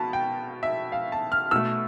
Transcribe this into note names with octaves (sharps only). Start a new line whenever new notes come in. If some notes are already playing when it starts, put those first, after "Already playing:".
Already playing: B2 A5 B5
G5
E5
F5
A5
F6
B2 A3 E6